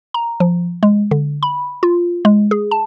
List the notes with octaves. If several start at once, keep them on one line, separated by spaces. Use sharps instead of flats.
A#5
F3
G#3
D3
B5
F4
G#3
G#4
A5